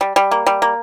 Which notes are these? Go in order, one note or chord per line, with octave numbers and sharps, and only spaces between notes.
G3
G3
A#3
G3
A#3